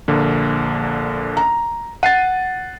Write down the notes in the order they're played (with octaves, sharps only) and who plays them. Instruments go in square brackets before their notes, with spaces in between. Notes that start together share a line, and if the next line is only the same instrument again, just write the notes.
[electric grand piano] A#1 D3 A#3
[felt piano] A#5
[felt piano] F#5 [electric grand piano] A6 C7 D#7